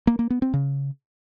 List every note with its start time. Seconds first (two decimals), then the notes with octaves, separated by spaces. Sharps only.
0.07 A#3
0.19 A#3
0.30 B3
0.42 C4
0.54 C#3